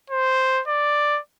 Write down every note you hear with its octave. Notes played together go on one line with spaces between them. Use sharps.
C5
D5